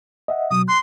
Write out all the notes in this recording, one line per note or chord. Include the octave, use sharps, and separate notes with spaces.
D#5 E5 F#5
B2 F#3 D#6
C6 F#6